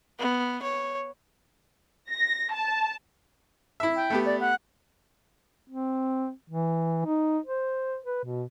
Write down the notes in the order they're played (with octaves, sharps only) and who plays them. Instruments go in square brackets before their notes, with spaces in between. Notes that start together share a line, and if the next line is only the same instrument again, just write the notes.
[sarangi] B3
C#5
[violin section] A#6
A5
[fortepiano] E4 E5
[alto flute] G5
[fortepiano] A3 B3 G4
[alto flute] D5
F#5
[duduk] C4
E3
D#4
C5
B4
B2